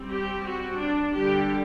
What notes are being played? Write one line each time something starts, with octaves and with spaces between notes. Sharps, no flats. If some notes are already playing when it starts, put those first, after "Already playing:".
Already playing: G3 C4
G4
F#4
D4
D3 G3 D4 G4